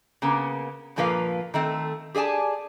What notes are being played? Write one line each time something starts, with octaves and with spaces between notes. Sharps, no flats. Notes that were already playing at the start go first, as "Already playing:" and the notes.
C#3 A#3 B3
G2 A#2 F3 A#3 B4 F5
D#3 A3 C4
G4 G#4 D5 G#5 A5